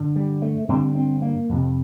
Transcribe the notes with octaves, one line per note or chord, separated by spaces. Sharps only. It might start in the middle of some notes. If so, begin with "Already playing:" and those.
Already playing: G2 D3
G3
A3
G2 D3 C4
C4
A#3
F2 C3